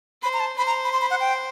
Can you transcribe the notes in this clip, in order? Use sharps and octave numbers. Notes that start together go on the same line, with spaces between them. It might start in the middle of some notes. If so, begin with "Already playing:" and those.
C5 B5
A#5
A5
C5 B5
A#5
B5
C6
B5
F#5
G5